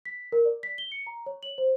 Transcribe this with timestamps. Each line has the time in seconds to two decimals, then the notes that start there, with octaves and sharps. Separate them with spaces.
0.05 B6
0.32 A#4
0.45 D5
0.63 B6
0.78 G7
0.92 C#7
1.07 A#5
1.26 C#5
1.43 F#7
1.58 C5